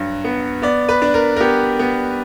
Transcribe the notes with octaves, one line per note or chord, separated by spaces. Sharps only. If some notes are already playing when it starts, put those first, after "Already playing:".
Already playing: G2 F#3
B3
B3 D5
B4
D4
A#4
A#4
B3 G4
B3